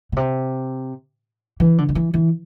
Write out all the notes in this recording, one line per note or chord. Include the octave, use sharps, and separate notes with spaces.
B2
C3
E3
D3
D3
E3
E3